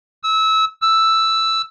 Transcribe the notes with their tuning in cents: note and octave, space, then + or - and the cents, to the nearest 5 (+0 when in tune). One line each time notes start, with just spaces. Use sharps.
E6 -25
E6 +0